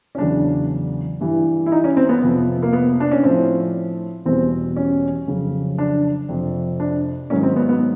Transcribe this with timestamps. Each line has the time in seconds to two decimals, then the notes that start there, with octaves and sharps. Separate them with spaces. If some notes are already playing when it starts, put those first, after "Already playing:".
0.15 C#4
0.18 E2 C#3 F#3 D4
1.21 G2 E3 G3
1.66 E4
1.72 D#4
1.84 C#4
1.97 C4
2.09 B3
2.22 F2 C3 F3 B3
2.63 A#3
2.73 B3
3.00 D4
3.11 C#4
3.23 A2 F3 C4
4.26 E2 B2 G3 C4
4.76 C#4
5.27 F2 C#3 F#3
5.78 D4
6.29 F2 C3 F3
6.80 D4
7.30 G#2 D#3 F#3 C#4
7.43 C4
7.56 B3
7.69 B3